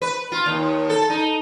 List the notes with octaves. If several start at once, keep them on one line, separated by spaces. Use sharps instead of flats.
B4
F4
D#2
A4
D#4